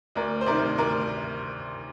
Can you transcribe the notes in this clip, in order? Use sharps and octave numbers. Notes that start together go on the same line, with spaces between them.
D2 A#4 D5
C5
C3 D#3 A#4 D5
D2 A#4 D5